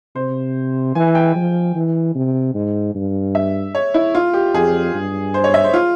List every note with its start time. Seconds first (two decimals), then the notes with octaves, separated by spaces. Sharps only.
0.15 C3 C5
0.95 E3 G#5
1.15 G5
1.35 F3
1.75 E3
2.15 C3
2.54 G#2
2.95 G2
3.35 E5
3.75 C#5
3.94 E4
4.15 F4
4.33 G4
4.54 F2 G#4
4.94 G2
5.34 C5
5.44 C#5
5.54 E5
5.64 C5
5.74 F4